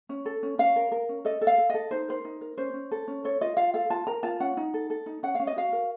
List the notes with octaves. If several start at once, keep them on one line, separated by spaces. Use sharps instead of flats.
C#4
A4
C#4
C#4 F5
A#4
A#4
C#4
A4 D#5
A4
F5
A4
A4 D#5
D#4 C5
A#4 C5
D#4
A#4
C#4 C5
C#4
A4
C#4
A4 C#5
F4 D#5
F4 F5
A4 F5
F4 A5
A#4 A#5
F4 A5
C#4 F#5
D#4
A4
A4
D#4
C#4 F#5
C#4 F5
D#5
F#4 F5
A#4